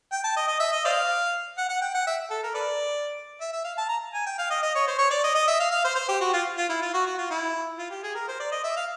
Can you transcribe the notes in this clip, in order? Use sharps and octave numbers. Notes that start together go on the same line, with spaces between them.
G5
A5
D#5
D#5
E5
D#5
C5 D5 F5
F#5
F#5
G5
F#5
E5
A4
A#4
A4 B4 D5
E5
E5
F5
A5
A#5
G#5
G5
F5
D#5
D#5
C#5
C5
C#5
D5
D#5
D#5
E5
F5
F5
C5
C5
G4
F#4
F4
F4
E4
F4
F#4
F#4
F4
E4
F4
G4
G#4
A#4
C5
D5
D#5
E5
F5